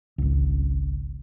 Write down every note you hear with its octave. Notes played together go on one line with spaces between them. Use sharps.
G#1 C#2